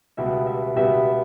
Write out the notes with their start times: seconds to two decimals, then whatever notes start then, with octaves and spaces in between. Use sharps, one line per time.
0.17 C#2 B2 G3 B3 G4 E5
0.47 E5
0.76 C#2 B2 G3 B3 G4 E5